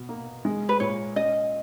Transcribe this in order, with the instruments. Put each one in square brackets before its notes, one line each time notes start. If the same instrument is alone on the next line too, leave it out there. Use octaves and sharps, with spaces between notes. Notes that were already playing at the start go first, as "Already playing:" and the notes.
Already playing: [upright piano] B2
A#3
G#3
[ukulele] B4
[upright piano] A#2 [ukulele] C#5
[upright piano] C#4 [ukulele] D#5